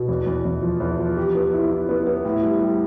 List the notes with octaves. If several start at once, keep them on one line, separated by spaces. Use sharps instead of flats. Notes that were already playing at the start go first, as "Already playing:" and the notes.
Already playing: B2
E2
E2
E2
F3
E2
F3
G4
B3
E4
E4
B3
B3
A2
G3
G3